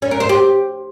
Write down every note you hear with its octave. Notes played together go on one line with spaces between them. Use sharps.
C#4
A#4
C5
G4